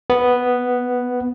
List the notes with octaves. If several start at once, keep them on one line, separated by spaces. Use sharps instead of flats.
B3